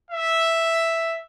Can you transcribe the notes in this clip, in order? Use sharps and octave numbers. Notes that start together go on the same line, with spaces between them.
E5